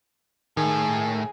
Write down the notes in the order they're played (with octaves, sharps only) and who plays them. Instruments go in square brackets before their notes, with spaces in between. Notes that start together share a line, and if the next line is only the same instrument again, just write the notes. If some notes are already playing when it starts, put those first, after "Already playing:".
[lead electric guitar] A2 [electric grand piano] D#3 [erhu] G#4